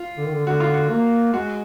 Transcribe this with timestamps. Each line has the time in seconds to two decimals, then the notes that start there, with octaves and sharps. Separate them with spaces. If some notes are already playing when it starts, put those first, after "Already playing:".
Already playing: F4
0.17 D3
0.26 D#3
0.33 D3
0.46 D3 F#4
0.60 F4
0.74 F#4
0.90 A#3
1.33 G#3 F#4